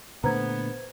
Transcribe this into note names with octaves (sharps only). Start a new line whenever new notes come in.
A#2 D3 A3 B3 B4 C5 A#5 G#6